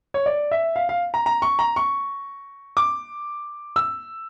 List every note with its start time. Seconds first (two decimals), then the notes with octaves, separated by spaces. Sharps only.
0.14 C#5
0.26 D5
0.51 E5
0.76 F5
0.89 F5
1.14 A#5
1.26 A#5
1.42 C#6
1.59 A#5
1.76 C#6
2.77 D6
3.76 E6